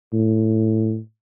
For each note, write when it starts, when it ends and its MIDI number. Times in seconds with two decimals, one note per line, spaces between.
0.13 0.98 45